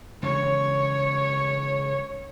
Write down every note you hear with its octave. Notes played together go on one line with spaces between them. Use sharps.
C#3 E3 G#3 C#5